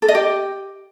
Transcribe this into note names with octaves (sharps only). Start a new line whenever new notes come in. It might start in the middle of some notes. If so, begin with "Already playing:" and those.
A4
D#5
G4